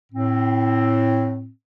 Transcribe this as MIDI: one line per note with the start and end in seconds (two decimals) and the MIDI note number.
0.12 1.49 45
0.12 1.49 60